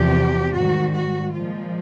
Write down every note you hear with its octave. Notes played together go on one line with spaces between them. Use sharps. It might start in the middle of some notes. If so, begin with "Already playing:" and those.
Already playing: E2 C3 F3 G4
G#2 D#3 G3 F#4
F#4
A#2 F3 G#3 F4